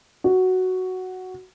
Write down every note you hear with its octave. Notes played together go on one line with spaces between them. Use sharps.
F#4